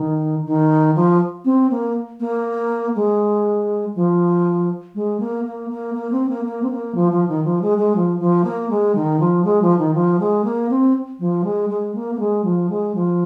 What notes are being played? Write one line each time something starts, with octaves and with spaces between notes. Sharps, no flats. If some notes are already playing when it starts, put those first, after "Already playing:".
Already playing: D#3
D#3
F3
C4
A#3
A#3
G#3
F3
G#3
A#3
A#3
A#3
A#3
C4
A#3
A#3
C4
A#3
F3
F3
D#3
F3
G#3
G#3
F3
F3
A#3
G#3
D#3
F3
G#3
F3
D#3
F3
G#3
A#3
C4
F3
G#3
G#3
A#3
A#3
G#3
F3
G#3
F3